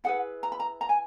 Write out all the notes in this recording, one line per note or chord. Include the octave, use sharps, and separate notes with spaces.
E4 G#4 B4 F#5
A#5
B5
A#5
A#5
G#5